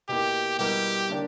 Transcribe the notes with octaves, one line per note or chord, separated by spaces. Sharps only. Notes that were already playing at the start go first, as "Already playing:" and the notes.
B2 A#3 E4 G4
B2 G3 B3 E4 G4 A#4
D3 A#3 D4